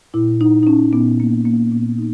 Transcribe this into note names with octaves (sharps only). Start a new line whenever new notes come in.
A#2 E4
D#4
D#4
C#4
A#2 B3
A#3
A#3
A#2 B3
D#4